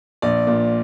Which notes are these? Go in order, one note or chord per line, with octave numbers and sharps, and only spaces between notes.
A#1 D5
A#2